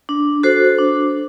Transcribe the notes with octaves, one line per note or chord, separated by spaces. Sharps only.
D4
F#4 A4 C5
D4